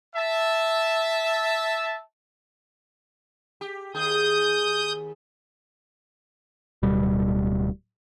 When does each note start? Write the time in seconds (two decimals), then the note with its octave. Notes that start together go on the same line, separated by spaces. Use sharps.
0.16 E5 A5
3.61 G4
3.95 D#2 G#4 D#6 G6
6.83 D1 B2 G3